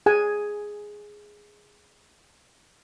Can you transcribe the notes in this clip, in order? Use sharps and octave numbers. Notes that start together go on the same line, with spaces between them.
G#4 G#5